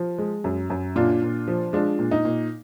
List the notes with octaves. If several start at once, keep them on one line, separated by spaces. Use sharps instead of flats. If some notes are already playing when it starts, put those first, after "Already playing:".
Already playing: F3
G#3
F#2
F#2
A#2 D4 F4
A#2
F3
G#3 D4 F4
A#2
D#4
A#2